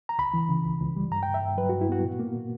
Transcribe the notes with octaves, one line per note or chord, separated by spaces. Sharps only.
A#5
C#2 B5
E3
C#3
C#2
C#2
G3
G2 A#5
G2 G5
E5
G2
F#3 B4
G2 F#4
E4
B3 F#4
A#2
A#3
A#2